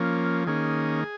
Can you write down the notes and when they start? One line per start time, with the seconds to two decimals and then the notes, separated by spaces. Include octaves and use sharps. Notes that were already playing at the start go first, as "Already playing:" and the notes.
Already playing: F3 A#3 C#4
0.47 D#3 A#3 C#4 G#4